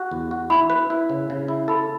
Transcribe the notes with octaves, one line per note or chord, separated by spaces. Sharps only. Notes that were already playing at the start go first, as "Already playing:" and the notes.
Already playing: F#4
E2
F#4
E4 B5
B4
E4
C#3
C#3
E4
A4 B5